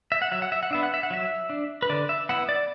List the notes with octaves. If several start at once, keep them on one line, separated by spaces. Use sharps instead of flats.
E5
F#5
F#3 E5
F#5
E5
F#5
B3 D4 E5
F#5
E5
F#5
F#3 E5
D4
B4
D3 D5
E5
B3 E4 F#5
D5